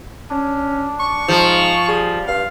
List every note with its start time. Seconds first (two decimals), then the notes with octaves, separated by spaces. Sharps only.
0.30 C#4 D4
1.00 C#6
1.28 G#2 F3
1.88 G3 G#4
2.28 G2 F5